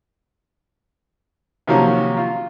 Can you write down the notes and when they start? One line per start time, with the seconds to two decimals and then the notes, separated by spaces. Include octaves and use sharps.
1.67 C3 D#3 F3 F#3 A#3 C#4
2.17 F4